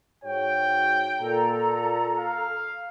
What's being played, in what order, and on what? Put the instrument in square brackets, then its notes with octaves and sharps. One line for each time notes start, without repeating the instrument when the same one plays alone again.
[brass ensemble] G#2 F#4 C#5 [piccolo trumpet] G5
[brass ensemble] A#2 [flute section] A4 A#5
[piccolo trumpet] F5